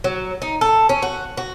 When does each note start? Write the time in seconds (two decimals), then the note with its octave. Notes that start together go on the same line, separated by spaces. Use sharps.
0.04 F#3
0.42 D#4
0.61 A4
0.89 C#4
1.02 F#4
1.37 F#4